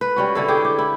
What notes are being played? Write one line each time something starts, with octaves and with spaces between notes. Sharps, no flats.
B4
G3 C#4 F#4
D3 E4 A4
G4 G#4
G4
E4